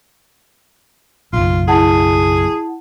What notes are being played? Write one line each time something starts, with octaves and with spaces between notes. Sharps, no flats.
F#1 B1 F4
E4 G#4 F#5 A5